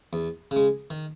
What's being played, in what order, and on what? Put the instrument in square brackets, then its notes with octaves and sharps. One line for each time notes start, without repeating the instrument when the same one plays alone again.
[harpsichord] E2
C#3
G#3
D#3